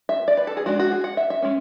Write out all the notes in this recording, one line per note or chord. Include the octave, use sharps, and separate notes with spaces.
E5
D5
B4
A4
G#4
G#3 D4 F#4
F#4
G#4
F#5
E5
E5
G#3 C#4